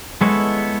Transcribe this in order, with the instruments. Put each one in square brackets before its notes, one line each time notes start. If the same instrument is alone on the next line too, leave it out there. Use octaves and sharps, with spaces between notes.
[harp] G#3 [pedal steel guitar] B3 E4 A4 C#5